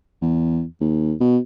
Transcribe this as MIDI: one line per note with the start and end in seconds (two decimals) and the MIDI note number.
0.22 0.64 40
0.81 1.13 39
1.20 1.38 47